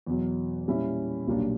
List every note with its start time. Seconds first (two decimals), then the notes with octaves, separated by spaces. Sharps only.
0.07 E2 B2 F#3
0.67 A#2 G3 C#4 E4
1.27 B1 A#2 G3 A#3 D4